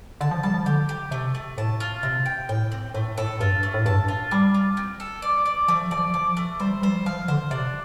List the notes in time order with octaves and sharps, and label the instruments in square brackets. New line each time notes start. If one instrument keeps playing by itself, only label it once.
[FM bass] D3 [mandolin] A5
[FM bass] F3
[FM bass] G3 [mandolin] A5
[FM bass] F3
[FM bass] D3 [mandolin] G4
[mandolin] G4
[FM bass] C3 [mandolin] A3
[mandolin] A3
[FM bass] A2 [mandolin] A5
[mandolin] F4
[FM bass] C3 [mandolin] C4
[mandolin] G5
[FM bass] A2 [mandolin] G5
[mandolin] C4
[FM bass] A2 [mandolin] A3
[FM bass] A2 [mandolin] A4
[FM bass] G2 [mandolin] F4
[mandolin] A3
[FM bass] A2
[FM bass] G2 [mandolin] A5
[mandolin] F4
[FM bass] G3 [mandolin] D4
[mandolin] F4
C4
A4
D5
D5
[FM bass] F3 [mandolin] A3
[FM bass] F3 [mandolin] D5
[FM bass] F3 [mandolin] D5
[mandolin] A3
[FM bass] G3 [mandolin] C5
[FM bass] F3
[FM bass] G3 [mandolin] C5
[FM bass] F3 [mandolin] F5
[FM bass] D3 [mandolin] C5
[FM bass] C3 [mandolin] D4